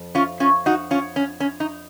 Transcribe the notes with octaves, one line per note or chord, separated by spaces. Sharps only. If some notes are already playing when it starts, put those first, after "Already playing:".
Already playing: F2
C#4 F4
C#4 F4
D#4 F#4
C#4 F4
C#4
C#4
D#4